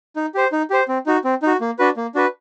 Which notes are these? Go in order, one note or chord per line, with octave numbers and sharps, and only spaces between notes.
D#4
G4 C5
D#4
G4 C5
C4
D#4 F#4
C4
D#4 F#4
A#3
D4 F#4 B4
A#3
D4 F#4 B4